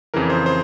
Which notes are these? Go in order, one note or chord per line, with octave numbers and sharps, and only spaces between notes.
F2 C#3 E3 A#4
C5
C5